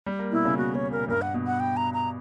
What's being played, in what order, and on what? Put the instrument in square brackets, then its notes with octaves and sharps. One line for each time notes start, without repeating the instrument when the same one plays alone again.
[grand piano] G3
A#3
[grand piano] B2 [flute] E4
[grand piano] C#3
[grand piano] B2 [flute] F#4
[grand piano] B2 [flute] C#5
[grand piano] A#2 [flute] A#4
[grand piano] G2 [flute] A#4
[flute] F#5
[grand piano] B2
[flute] F#5
G5
A#5
A#5